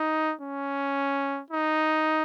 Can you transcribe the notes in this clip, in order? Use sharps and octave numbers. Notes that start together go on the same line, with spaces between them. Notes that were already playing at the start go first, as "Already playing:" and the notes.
Already playing: D#4
C#4
D#4